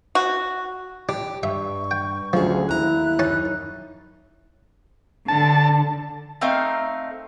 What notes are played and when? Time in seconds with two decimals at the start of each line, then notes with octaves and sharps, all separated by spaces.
0.15 F#4
1.09 D4 G4
1.43 G2 E5 C#6
1.91 G5
2.33 D2 F3 F#3 C#4 G#4
2.69 D#2 E4 A#5 F#6
3.19 F#2 C#4 D#4 A5
5.28 D3 A5
6.41 A3 C4 D#4 F5